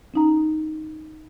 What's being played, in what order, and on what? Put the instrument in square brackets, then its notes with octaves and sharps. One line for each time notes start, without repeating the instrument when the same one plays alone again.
[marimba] C#4 D#4 A#5